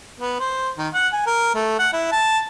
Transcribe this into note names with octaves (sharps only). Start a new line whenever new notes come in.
B3
C5
D#3
F#5
G#5
A#4
A3
F#5
E4
A5